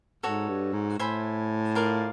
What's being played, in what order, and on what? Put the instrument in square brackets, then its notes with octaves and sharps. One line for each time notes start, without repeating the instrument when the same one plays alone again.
[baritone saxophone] G#2 [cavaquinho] F#4 A4 C#5
[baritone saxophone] G2
G#2
[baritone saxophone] A2 [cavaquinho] C5 E5 G#5 B5
[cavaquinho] F4 A#4 D5 F5